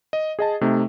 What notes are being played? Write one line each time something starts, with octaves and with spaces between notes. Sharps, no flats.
D#5
G#4 D#5 A5
C3 A3 D#4